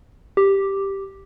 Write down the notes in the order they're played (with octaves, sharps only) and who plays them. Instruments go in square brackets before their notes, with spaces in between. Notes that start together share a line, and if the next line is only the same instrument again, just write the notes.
[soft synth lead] G4